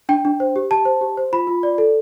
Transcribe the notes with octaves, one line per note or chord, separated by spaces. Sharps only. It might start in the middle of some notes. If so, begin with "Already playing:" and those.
D4 G5
D4
C5
G4
G4 A5
C5
G4
C5
F4 B5
F4
D5
A4